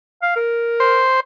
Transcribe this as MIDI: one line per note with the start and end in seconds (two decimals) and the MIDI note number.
0.22 0.35 77
0.36 1.03 70
0.80 1.20 72